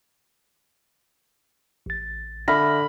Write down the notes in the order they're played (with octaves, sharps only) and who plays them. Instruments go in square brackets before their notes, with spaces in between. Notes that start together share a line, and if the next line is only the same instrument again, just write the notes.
[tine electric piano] A1 A6
[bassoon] D3 [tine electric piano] E5 F6 A#6 [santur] B5